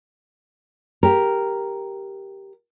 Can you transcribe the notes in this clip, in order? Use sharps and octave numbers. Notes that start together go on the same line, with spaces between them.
G4 A#4